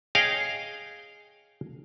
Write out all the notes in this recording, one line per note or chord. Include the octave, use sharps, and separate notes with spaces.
G#4 C#5 D#5 F5 G5